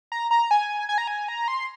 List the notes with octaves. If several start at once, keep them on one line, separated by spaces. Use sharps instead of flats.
A#5
A#5
G#5
G#5
A#5
G#5
A#5
C6